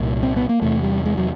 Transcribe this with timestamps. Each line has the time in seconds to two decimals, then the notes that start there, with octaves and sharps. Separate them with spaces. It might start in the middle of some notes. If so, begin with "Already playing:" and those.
Already playing: C2 A#2
0.23 C4
0.36 B3
0.49 A#3
0.62 E2 C3 A3
0.83 G3
1.06 G#3
1.17 F#3